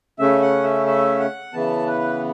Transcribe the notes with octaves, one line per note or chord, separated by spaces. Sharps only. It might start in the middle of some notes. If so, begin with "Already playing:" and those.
C#3 A3 C#4 E5
F#5
E5
E5
F#5
C#3 E3 B3 A5
B4